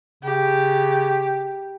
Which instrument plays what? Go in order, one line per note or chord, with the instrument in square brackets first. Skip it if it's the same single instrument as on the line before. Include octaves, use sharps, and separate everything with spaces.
[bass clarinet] C#3 [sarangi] G4